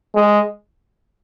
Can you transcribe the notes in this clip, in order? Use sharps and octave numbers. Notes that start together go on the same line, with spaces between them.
G#3